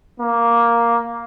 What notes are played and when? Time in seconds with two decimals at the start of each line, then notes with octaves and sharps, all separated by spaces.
0.20 A#3